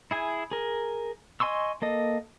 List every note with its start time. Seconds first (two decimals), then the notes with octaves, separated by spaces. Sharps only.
0.11 E4 G#4 G#5
0.51 G#4 A#4
1.40 D#5 G#5 C6 C#6 E6
1.82 A#3 A4 D#5